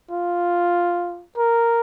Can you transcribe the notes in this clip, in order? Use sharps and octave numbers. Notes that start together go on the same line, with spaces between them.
F4
A#4